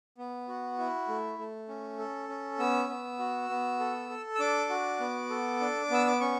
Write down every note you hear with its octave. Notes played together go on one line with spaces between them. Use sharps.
B3
F#4
E4
A3
A3
C#4
A4
C#4
B3 E6
B3
F#4
B3
A4
A4
E6
D4 D6
F#4
B3
A4
D4
B3 E6
D6
C#4 C#6